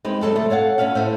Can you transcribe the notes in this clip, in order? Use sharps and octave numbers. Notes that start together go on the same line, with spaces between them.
G#3 C4 D#4 G4 B4
F#3 G#3 A4 B4
D2 C3 A3
A4 C#5 F5 F#5
A3 C#4 B4 F5 F#5
A2 A3 C5